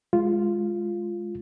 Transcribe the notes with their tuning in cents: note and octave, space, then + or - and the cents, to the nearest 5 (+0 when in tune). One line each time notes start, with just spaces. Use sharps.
G#3 +0 F4 -5